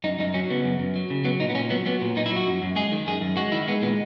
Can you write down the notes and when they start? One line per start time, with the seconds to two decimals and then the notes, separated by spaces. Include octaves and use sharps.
0.04 F#2 D#4
0.19 F#2 D#4
0.34 F#3 C#4
0.50 C#3 B3
0.64 F#2
0.79 F#2
0.96 F#3
1.10 C#3
1.25 F#3 B3
1.40 A#2 D#4
1.50 B3
1.55 A#2 C#4
1.70 F#3 B3
1.86 F#3 B3
2.01 A#2
2.16 A#2 D#4
2.26 E4
2.31 F#3
2.36 F#4
2.47 F#2
2.62 F#2
2.76 G#3 G#4
2.92 D#3
3.07 F#2 G#4
3.21 F#2
3.37 G#3 F#4
3.52 D#3 E4
3.67 G#3 B3
3.82 A#2 B3